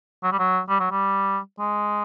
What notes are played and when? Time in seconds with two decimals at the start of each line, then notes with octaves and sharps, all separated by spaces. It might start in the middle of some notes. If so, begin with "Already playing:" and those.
0.23 F#3
0.32 G3
0.39 F#3
0.69 G3
0.80 F#3
0.91 G3
1.59 G#3